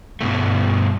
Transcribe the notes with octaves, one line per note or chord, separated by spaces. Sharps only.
G2 B2 A3